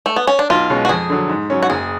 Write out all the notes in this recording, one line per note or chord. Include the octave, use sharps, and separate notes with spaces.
A3
B3
C#4
D4
B1 F4
B2 G#3 C#4
F#4
F2 G#4
D3 F#3
G#2
F#3 C#4
F#4
F#1 G#4